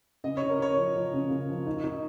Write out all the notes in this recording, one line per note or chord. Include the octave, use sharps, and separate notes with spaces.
C#3 D#5
C#5
C#3
A#4
C#3 C#5
F3
F3
C#3
C#3
F3
D#4
D#4